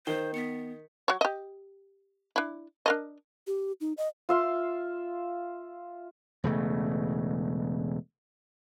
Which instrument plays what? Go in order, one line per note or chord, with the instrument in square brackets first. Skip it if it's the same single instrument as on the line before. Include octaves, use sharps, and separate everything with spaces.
[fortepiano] D#3 [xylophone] A#4 C7 G7 [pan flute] C5
[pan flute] B3 [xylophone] B6 C#7
[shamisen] F#3 C#5
G4 D#5
D4 E4
D4 A#4 D#5
[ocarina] G4
D#4
D#5
[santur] F4 E5 C6
[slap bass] E1 C#3 A3